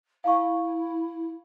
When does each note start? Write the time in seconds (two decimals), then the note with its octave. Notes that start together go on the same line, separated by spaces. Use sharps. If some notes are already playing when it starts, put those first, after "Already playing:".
0.24 E4 F5 A5 C#6